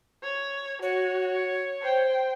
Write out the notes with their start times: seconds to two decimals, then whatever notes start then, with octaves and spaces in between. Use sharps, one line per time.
0.23 C#5
0.82 F#4 C#5
1.82 C5 G5